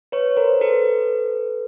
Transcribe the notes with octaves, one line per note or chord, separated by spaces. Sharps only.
B4 C#5
A#4 C5
A4 B4